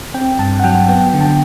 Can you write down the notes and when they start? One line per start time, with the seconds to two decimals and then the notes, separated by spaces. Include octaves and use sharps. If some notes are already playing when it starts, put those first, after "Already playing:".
0.14 C4 G5
0.39 G2 A5
0.60 F#5
0.64 F#3 G5
0.89 B3 G5
1.14 D3
1.21 A5
1.25 G5